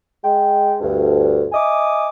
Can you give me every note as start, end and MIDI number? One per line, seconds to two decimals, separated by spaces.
0.23 0.75 56
0.23 0.75 79
0.81 1.46 38
0.81 1.46 43
1.52 2.08 75
1.52 2.08 76
1.52 2.08 80
1.52 2.08 86
1.52 2.08 87